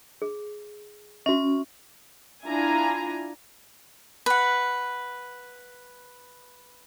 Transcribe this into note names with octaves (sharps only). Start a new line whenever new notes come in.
G#4
C#4 F#4 E5
D4 E4 F4 G#5 A#5
B4 F#5